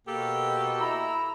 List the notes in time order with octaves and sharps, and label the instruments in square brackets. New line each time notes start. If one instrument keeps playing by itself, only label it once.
[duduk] B2 [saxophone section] A#3 G4 A4
[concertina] E4 E6 [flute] A#5